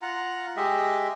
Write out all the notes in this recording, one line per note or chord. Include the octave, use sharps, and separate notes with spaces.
F4 F#5 A#5
G#3 G4 D#5 E5